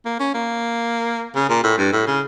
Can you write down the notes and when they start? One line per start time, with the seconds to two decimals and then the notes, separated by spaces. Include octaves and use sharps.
0.05 A#3
0.20 C#4
0.34 A#3
1.35 C#3
1.49 A#2
1.64 A2
1.78 G2
1.92 A2
2.07 C#3